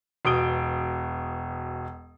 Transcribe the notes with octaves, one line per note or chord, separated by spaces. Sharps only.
E1 B2 D#6 D7 G7